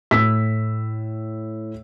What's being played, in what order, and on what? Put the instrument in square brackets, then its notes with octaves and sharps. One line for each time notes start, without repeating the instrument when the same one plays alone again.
[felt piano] A2 E6 B6